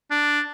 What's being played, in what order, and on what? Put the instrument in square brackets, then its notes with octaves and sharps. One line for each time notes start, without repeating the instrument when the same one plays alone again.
[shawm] D4